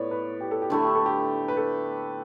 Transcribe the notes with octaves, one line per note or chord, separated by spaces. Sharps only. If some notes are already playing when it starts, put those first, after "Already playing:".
Already playing: A2 B3 C#5 D5
B4
G4
A4
G4
D3 A3 E4 A4
G4
A4
G4
B4
A4